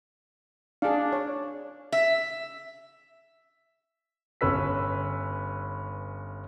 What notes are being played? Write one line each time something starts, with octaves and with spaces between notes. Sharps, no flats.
D4 G#4 F5
C#5
E5
G1 C#4 B4 E6 B6